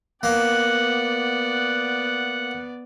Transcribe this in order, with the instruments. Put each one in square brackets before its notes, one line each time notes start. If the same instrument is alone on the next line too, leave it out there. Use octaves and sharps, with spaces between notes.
[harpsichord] A#3 [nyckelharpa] B3 D5 [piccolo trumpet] F#5